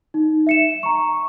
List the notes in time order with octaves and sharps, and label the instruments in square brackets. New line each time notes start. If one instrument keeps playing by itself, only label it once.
[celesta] D#4
E5 C#7 E7
A#5 C#6